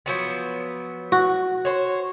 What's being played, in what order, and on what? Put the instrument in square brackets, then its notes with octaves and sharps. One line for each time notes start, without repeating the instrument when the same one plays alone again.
[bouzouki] F3 F#3 B3
[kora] F#4
[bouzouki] C5 C#5